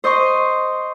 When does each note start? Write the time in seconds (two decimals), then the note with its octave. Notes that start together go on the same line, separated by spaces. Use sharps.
0.04 C5 D#5 C6 C#6